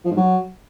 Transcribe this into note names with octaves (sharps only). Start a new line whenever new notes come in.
F3
G#2
F#3